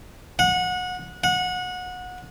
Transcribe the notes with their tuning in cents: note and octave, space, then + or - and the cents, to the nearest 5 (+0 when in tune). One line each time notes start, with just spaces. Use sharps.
F#5 -25
F#5 -25